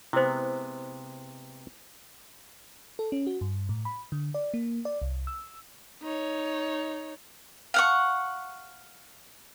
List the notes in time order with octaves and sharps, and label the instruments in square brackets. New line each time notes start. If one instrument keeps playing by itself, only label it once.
[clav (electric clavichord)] C3 G#3 B3 [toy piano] E4 C5
[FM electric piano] A4
C#4
F#4
G2
A2
B5
D3
D5
A#3
D5
C2
E6
[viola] D#4 C#5
[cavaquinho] F5 F#5 C#6